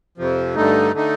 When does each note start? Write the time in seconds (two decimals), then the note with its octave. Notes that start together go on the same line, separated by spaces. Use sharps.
0.18 F2 C3 F3
0.55 G2 D3 A3 D#4
0.93 D3 A3 D#4